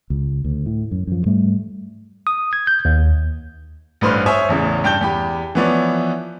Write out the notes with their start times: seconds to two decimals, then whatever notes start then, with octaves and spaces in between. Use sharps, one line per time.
0.10 C#2
0.45 D2
0.66 A2
0.91 F#2
1.07 F#2 F3
1.26 G#2 G3 A3
2.27 D#6
2.53 G#6
2.67 G6
2.85 D#2
4.01 A1 G2 B4 C5 C6 F6
4.26 C5 C#5 E5 G#5 D#6 E6
4.49 A1 E2 C#3
4.84 G2 G5 A5 G6 G7
5.01 E2 G4 B5
5.55 E3 F3 B3 C#5 D5